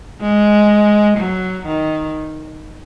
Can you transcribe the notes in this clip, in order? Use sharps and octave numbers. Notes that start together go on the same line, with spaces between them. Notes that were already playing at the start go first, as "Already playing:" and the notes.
G#3
F#3
D#3